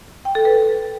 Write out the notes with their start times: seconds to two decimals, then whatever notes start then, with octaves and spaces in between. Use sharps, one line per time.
0.25 G5
0.35 A4
0.45 B4